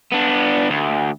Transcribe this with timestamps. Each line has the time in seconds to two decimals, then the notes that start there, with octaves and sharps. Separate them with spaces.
0.12 B3 D4
0.70 D2